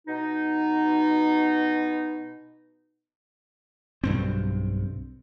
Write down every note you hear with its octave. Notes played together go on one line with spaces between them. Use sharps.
B2 D#4
B1 G2 C4